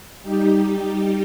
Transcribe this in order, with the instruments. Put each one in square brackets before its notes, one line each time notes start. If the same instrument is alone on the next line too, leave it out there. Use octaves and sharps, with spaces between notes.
[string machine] G3 D#4 G4